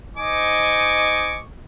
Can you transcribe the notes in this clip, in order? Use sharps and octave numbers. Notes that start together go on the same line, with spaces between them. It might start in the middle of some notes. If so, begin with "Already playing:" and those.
D#4 C5 D#5 G#5 C#6 D6